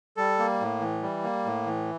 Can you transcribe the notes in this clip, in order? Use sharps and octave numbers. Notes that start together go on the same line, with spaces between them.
G3 A4
A#3
A2
E3
G3
A#3
A2
E3